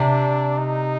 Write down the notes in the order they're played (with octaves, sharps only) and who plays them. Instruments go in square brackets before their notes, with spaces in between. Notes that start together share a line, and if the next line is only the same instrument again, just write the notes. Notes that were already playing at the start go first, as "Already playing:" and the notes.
Already playing: [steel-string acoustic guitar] C3 [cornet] D4
[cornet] D#4